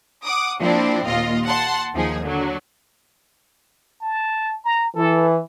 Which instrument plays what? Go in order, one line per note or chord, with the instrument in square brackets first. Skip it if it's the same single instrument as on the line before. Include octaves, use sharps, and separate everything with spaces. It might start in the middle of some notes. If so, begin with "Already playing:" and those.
[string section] F#5 D6 D#6
F3 A#3 C4 D4 E4
D#2 A#2 F4 D#5
F#5 A5 C6
D#2 F3 D#4 G#4
D3 F#3
[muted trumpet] A5
A#5
[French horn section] E3 [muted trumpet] A4